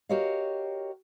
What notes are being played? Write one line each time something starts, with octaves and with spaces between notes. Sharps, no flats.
F#4 G4 A#4 C#5 D#5 F5